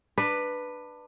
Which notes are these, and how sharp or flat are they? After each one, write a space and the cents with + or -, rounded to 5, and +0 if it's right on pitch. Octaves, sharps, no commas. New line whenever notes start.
D4 +25 B4 +0